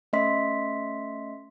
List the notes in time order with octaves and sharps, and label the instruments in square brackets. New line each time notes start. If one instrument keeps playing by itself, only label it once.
[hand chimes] A3 C#4 D#5 E5 C6 B6